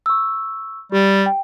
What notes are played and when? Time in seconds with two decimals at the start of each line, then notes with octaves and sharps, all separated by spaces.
0.06 C#6 E6
0.92 G3 G4
1.26 G5